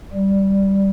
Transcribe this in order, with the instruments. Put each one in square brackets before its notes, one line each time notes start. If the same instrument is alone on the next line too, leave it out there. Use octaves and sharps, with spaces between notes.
[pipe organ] G3